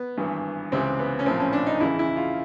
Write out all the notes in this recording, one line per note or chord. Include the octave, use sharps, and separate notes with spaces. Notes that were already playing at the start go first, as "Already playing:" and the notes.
Already playing: B3
G#1 G2 E3
C#2 C3 E3 C4
B3
C#4
A#1 A2 F3 C4
C#4
D4
D#4
E2 C#3 E3 E4
E4
F4